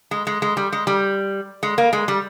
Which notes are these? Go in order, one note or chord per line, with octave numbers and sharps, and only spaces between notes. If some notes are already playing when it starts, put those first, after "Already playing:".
G#3
G#3
G#3
G3
G#3
G3
G#3
A#3
G#3
G3